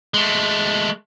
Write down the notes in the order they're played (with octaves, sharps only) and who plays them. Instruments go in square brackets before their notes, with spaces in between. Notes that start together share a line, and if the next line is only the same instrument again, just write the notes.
[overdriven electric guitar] G#3 A3